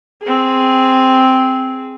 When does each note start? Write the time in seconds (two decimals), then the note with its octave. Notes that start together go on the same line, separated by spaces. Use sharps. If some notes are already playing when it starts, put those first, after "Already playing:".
0.22 C4 G#4